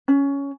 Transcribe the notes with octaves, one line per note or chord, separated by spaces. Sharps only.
C#4